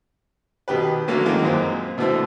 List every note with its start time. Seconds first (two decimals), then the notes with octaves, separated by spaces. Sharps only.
0.68 B2 D#3 G4 B4
1.08 D3 F#3 A3 A#3 C#4 D4
1.26 D#3 E3 F#3 G#3 A#3
1.43 F#2 A#2 G#3 A#3 C4
1.98 B2 D3 E3 A3 C4